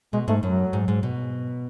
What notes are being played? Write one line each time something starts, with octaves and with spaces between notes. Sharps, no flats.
B2 G#3
G#2 A3
F#2 F#3
G#2
G#2
B2